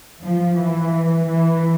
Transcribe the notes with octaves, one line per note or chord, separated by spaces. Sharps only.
F3
E3
E3